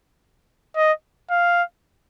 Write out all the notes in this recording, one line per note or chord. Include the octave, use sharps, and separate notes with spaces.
D#5
F5